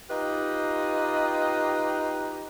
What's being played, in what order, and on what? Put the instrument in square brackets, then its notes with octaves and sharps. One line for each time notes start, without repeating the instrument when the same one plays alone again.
[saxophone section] D#4 F4 G4 B4 D#5